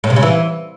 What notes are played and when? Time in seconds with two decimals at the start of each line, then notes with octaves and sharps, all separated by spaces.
0.04 A2
0.10 C3
0.16 C#3
0.23 E3